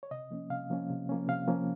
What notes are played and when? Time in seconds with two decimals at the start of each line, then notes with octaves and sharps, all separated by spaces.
0.03 C#5
0.11 C3 D#5
0.31 F3 A#3 C#4
0.50 C3 F5
0.70 F3 A#3 C#4
0.90 C3
1.09 F3 A#3 C#4
1.28 C3 F5
1.48 F3 A#3 C#4